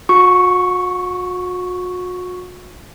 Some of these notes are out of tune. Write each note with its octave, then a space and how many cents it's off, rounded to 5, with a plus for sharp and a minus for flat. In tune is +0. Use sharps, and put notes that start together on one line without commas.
F#4 -40 C#6 +0